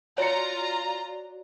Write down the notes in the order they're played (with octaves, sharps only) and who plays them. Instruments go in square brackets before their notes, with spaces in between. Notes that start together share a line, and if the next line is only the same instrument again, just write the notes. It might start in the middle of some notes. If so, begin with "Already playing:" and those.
[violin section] F4 A#5 [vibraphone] F#4 D5 [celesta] C#5 C#7